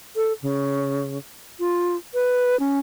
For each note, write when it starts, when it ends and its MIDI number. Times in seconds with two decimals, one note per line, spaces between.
0.16 0.33 69
0.42 1.18 49
1.60 1.96 65
2.14 2.59 71
2.60 2.79 61